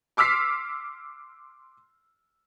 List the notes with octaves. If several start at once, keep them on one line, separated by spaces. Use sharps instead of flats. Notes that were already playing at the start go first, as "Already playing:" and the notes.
C6 D6 E6 F6 B6 C7